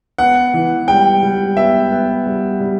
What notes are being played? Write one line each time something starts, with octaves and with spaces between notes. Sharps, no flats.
B3 F#5
E3
G3 G5
G3
B3 E5
B3
G3
G3